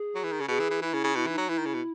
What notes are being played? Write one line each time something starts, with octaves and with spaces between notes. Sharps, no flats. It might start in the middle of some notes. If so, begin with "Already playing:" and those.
Already playing: G#4
F#3
E3
D#3
C#3
B2 G#4
E3
E3
E3 E4
C#3
C#3
B2 E4
E3
D#4
F#3
E3 E4
D#3
C#3
B2